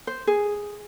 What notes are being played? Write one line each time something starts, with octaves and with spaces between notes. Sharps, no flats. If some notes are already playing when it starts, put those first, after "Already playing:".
C5
G#4